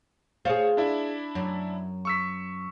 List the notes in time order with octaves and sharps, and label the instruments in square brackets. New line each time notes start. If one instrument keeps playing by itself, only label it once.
[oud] F4 G#4 [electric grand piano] C5 C#5
[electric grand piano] D4 E4 E5
[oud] F#2
[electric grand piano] C#6 E6 B6